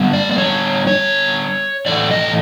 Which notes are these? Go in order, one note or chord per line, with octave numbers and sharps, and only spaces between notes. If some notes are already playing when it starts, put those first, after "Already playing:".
Already playing: D3 G3 B3
D5
D5
C#5
C#5
A2 E3 A3 D5
D#5